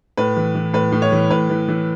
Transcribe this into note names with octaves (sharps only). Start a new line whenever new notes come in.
A2 B4
E3
E3
A2 B4
A2
C#5
E3
A2 B4
E3
E3